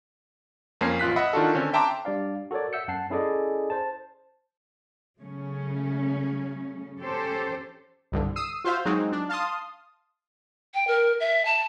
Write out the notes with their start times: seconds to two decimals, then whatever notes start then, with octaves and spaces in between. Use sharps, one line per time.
0.81 F2 A#3 C#4 C6 C7
0.99 A1 F4 F#6 B6
1.16 D#5 E5 F#5 B5 E6
1.33 D#3 D4 F4 F#4 A4
1.55 D3 C4 C#4
1.73 E5 G5 A5 A#5 C6 D6
2.05 G3 D4 D5 F5
2.51 F#4 A4 A#4 C#5 D5
2.73 E5 F#5 E6 G6 C#7
2.88 F#2 F#5 A5 C7
3.10 C#4 E4 G#4 A4 D5 D#5
3.70 C5 A5
5.19 C#3 F#3 A3 C#4
7.00 C#4 G4 A4 C5
8.12 C2 G2 D3
8.36 D#6 E6 C7 D#7
8.64 F4 F#4 C5 E5 F5
8.85 F#3 G#3 C4 D#4 F#4
9.12 D4
9.29 F5 A5 C6 D#6
10.74 G5
10.87 A#4
11.20 E5
11.45 A5